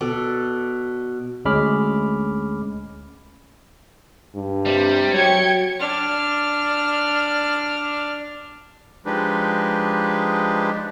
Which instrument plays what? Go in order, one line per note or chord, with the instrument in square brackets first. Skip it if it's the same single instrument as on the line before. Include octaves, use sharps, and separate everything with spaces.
[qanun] B2 A4 D5
[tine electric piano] D2 G#3 C#4 B5 D6 F6
[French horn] G2
[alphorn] C3 [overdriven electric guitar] G3
[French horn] F#3 [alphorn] C#5 [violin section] G5 G#6 C#7
[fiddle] D4 F6
[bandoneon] F3 G#3 D4 D#4 G4 B4